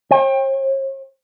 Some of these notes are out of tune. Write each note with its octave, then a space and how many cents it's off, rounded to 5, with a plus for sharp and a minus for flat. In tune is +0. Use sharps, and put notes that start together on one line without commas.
C#5 -45 G5 +25